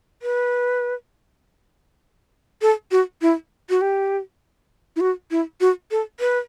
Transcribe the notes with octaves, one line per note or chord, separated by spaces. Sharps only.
B4
A4
F#4
E4
F#4
G4
E4
F#4
E4
F#4
A4
B4